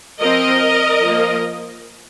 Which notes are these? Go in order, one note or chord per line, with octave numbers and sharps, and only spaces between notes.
F3 C4 A#4 D#5
F3 A#3